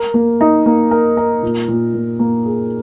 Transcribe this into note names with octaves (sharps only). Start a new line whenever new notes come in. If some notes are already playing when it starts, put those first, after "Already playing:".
Already playing: A#4
A#3
D#4
A#3
A#4
A#4
A#2
A#2
A#2
A#3
G#4